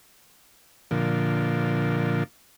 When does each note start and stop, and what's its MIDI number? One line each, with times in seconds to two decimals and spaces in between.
0.91 2.23 46
0.91 2.23 50
0.91 2.23 53